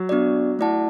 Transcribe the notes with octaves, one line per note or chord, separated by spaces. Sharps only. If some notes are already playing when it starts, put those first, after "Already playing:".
Already playing: F#3
B3 D4 F#4 D5
A3 E4 D5 F#5 A5